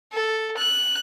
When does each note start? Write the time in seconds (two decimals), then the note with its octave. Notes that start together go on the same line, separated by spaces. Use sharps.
0.13 A4
0.58 F#6